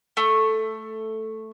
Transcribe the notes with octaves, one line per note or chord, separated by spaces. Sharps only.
A3